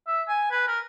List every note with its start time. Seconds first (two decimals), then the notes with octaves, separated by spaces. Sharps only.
0.07 E5
0.28 G#5
0.51 B4
0.67 A#4